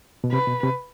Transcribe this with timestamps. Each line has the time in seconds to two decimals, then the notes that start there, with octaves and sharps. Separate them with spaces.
0.24 B2
0.32 C3 B4
0.48 B2
0.63 C3